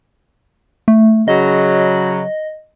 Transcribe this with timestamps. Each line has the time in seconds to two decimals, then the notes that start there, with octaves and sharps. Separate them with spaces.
0.88 A3
1.28 C#3 F#3 D#5